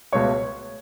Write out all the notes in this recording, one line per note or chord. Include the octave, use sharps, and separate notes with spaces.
C#2 B2 A3 C#5 C#6